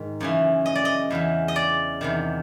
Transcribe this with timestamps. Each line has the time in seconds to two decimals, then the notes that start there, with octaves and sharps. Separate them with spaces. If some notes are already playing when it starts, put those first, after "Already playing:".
Already playing: G#2 D#3
0.21 F#2 C#3 E3
0.66 D#5
0.75 D5
0.85 D#5
1.11 E2 C#3 E3
1.48 D#5
1.56 D5
2.01 E2 C3 D#3